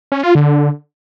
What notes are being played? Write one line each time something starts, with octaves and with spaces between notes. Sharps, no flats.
C#4
F4
D3